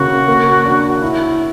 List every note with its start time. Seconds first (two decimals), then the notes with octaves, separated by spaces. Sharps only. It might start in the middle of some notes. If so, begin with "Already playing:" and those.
Already playing: C#3 A#3 F#4
0.28 A#3
0.65 D4
1.02 E4